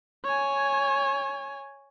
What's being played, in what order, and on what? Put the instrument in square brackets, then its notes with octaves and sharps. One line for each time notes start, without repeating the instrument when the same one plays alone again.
[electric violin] C#5 G#5